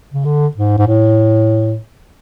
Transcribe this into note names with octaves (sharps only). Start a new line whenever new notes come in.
C#3
D3
G#2
G#2
A2